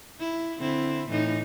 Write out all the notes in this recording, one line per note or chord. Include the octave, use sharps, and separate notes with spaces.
E4
D3 C4 E4
A2 E3 D#4